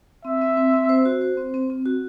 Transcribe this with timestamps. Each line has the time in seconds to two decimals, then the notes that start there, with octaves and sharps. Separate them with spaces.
0.25 C4 E5
0.41 C4
0.57 C4
0.74 C4
0.89 C5
1.05 F#4
1.21 C5
1.37 C4
1.54 C4
1.70 C4
1.86 F#4